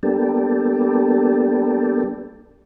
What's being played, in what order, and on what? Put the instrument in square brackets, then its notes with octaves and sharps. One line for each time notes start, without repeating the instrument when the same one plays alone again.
[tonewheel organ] G3 A#3 B3 D4 G4 A4